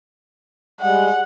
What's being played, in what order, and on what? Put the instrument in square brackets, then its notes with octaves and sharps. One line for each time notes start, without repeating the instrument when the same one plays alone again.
[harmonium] G3 G#3 [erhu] F#5